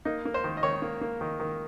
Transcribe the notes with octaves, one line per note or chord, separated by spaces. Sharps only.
A#3 D#4
A#3
C5
D#3
D#5
D#3 C#5
A#3
A#3
D#3
D#3